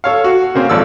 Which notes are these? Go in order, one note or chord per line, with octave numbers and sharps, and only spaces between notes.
A4 C#5 F5
F#4
C#3 A#3 C4 C#4
G#1 F3 A4 D5 E6